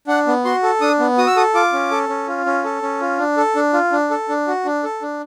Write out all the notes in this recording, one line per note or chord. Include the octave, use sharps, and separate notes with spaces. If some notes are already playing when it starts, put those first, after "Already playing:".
D4 F#5
B3
F#4 C6
A4
D4 D#6
B3
F#4 D#6
E6
A4 D#6
F4 D6
C#4
A4
C#4
F4
C#4
A4
C#4
F4
D4
A4
D4
F4
D4
A4
D4
F#4
D4
A4
D4